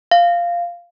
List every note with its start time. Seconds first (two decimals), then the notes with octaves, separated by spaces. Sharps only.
0.11 F5